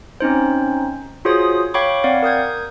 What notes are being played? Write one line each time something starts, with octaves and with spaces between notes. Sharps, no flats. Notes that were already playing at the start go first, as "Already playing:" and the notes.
C4 C#4 D#4 C5
F4 F#4 G#4 C5 C#5 D#6
C#5 F5 G5 B5 C#6 D6
C4 D5 F5 F#5
A#4 D#6 G6 G#6